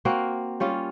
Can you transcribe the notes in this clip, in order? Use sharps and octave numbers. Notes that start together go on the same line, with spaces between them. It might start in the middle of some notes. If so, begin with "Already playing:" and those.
A#3 C4 F#4
G3 C#4 F4